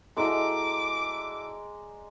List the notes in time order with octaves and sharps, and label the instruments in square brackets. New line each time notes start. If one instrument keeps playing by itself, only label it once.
[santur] G#3 D5 A#5 [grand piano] E4 F#4 A4 [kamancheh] D6